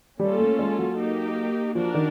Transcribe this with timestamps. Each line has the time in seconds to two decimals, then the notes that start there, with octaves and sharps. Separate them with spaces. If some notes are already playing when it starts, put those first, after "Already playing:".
0.20 G3 A#3 C#4 F4 A4
0.39 A3
0.59 G#3
0.78 F#3
0.97 A#3 D#4 G4
1.75 F3 D4 F#4 A#4
1.94 D#3